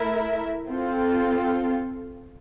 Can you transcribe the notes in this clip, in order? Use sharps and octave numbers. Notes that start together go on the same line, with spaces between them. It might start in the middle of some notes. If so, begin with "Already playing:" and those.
Already playing: A3 E4 A#4 E5
C4 F4 A4